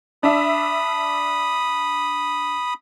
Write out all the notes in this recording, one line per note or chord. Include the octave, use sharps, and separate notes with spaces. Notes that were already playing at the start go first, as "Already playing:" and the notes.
D4 E5 B5 D#6